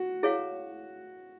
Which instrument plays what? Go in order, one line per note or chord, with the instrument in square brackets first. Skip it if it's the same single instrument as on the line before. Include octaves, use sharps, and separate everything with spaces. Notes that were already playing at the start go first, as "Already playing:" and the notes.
Already playing: [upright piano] F#4
[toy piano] E4 G#4 C#5 F5